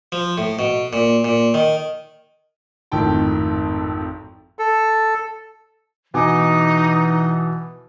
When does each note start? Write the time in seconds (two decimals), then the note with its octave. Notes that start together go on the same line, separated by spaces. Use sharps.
0.12 F3
0.38 A2
0.59 B2
0.93 A#2
1.24 A#2
1.54 D#3
2.92 G#1 F2 A2 D#3 G5 A5
4.59 A4
6.14 B2 E3 D#4 G#5 D6